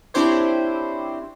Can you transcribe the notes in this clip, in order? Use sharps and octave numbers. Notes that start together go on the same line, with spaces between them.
C4 D4 E4 G4 C5 C#5